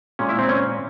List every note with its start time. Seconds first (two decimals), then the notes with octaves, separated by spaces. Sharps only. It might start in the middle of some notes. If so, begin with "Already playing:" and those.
0.19 A#2 G#3 C#4
0.29 E4
0.39 C4
0.49 C#4